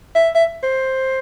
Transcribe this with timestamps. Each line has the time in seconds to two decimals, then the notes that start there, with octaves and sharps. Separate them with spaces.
0.15 E5
0.35 E5
0.63 C5